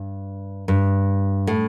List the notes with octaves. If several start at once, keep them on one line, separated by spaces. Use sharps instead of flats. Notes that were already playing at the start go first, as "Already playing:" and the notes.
Already playing: G2
G2
A2